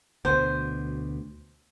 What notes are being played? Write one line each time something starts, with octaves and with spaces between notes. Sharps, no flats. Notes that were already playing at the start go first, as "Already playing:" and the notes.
D2 B2 C5